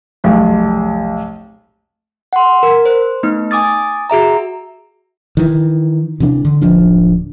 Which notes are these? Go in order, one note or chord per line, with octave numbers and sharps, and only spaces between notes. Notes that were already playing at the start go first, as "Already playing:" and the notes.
F1 B1
F#5 C6
A#4
C5
A3 B3 D#4
G#5 D6 D#6 A6
F#4 G#4 E5 A#5
D#3 E3
C3 E3 D4
D3
D1 F3 D4